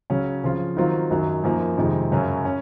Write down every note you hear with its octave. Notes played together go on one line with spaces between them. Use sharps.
C#3 F#3 C#4
C#3 F3 C4 F4
D#3 F#3 C4 F4
F#2 D#3 F#3
F#2 F3 A#3 D#4
F2 C3 D#3 G#3
F#2 C#3 F#3 C#4
C#4